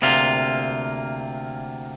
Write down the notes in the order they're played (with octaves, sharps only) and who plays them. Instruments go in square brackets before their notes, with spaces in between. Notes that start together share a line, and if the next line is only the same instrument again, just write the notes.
[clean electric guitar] D2 C3 A#3 F4